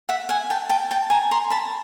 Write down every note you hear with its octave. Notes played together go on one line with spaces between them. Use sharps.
E5 F#5
F#5 G#5
G5 A5
G5 A5
G5 A5
G#5 A#5
A#5 C6
A5 B5